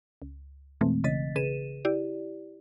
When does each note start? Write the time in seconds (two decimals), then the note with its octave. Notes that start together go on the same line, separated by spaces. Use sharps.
0.22 C#2
0.81 F2 B2 E3 G#3 A3 C4
1.04 A1 C#3 E3 D#5 A6 B6
1.35 A1 C#3 G#4 B4 D#7 E7
1.85 E4 G4 D5